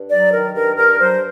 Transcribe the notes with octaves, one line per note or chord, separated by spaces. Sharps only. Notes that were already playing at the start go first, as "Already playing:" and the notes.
Already playing: G2
F#3 D5
D#3 A#4
G2 A#4
G2 A#4
F#3 C5